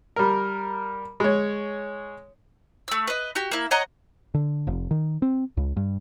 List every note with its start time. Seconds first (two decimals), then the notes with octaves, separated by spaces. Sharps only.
0.16 G3 A#4
1.20 G#3 C#5
2.88 A3 E6
3.07 B4 D#5
3.35 F#4 G4
3.51 A#3 E4
3.71 C#5 D#5 F#5 A#5
4.34 D3
4.67 F1
4.91 D#3
5.22 C4
5.57 C#2
5.77 G2